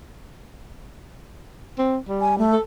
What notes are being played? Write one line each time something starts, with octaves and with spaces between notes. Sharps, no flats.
C4
G3
G#5
A3
A4